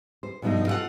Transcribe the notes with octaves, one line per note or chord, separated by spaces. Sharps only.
C5
G2 B2 F3 A3 D#4
F4 A4 D5 F5 F#5